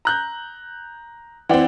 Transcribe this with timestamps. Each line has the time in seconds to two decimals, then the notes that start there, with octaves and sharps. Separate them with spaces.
0.05 A#5 F#6 G6
1.49 E3 C4 D5 F#5 G5